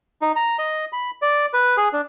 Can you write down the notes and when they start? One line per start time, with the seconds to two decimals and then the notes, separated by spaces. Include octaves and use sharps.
0.22 D#4
0.36 A#5
0.59 D#5
0.93 B5
1.22 D5
1.53 B4
1.77 G#4
1.93 D4